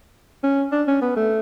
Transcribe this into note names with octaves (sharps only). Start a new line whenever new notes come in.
C#4
D4
C#4
B3
A3